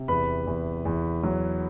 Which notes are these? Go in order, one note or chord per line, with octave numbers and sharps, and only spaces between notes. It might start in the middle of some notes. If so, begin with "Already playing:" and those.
Already playing: C3
E2 B4 B5
E2
E2
F#3